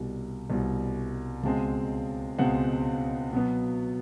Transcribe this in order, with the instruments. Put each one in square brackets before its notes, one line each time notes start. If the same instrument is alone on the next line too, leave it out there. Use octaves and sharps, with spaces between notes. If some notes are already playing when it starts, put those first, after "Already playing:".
Already playing: [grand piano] C2 B2 G3
C2 B2 G3
C#2 B2 G#3 C4 A5
C#2 B2 G#3 C4 F#5
B2 F#3 B3